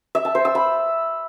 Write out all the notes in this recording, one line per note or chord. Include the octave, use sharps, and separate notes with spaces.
E5
A5
C5
E6
B5